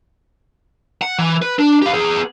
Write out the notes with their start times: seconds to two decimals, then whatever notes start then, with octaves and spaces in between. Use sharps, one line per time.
1.02 F#5
1.19 E3
1.42 B4
1.59 D4
1.82 G4 F5
1.94 B3 G#4